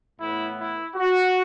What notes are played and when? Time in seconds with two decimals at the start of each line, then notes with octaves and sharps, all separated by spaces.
0.19 A2 E3 B3 E4
0.58 E4
0.96 F#4